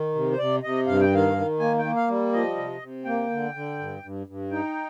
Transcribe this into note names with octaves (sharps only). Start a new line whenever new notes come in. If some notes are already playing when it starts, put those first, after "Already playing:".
Already playing: D#3
C3
C5
C3 D5
C3 D#5
G2 F5
G5
D#3 F5
D#3
A#3 G#5
G5
A#3
F5
G3
F3 D#5
C3
C3
A#3 G5
D3
D3
G2
G2
G2
D#4 G5